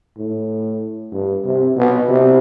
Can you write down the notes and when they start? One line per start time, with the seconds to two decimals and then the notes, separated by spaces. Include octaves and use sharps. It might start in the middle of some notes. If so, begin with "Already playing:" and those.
0.17 A2
1.12 G2
1.44 C3
1.76 B2
2.08 C3